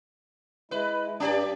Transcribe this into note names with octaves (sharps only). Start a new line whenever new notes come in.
G#3 E4 B4
G2 C#4 G4 D5